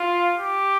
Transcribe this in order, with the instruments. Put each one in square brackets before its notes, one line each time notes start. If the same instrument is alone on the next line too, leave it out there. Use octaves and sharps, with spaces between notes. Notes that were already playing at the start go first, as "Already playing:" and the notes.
Already playing: [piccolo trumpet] F4
G4